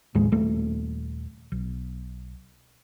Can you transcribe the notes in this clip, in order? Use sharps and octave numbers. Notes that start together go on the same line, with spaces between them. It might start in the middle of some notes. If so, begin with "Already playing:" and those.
D#2 A2 G#3
D#1 A3
B1